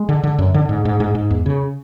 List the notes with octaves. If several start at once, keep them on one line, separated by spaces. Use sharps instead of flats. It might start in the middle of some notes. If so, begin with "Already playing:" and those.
Already playing: G#3
D3
D3
F#2
D3
G#2
G#2
G#2
G#2
E2
C#3